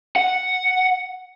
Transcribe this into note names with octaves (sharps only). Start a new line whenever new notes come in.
F#5